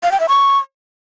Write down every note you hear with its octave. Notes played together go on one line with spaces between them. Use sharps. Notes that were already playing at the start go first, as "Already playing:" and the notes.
F5
G5
E5
C#6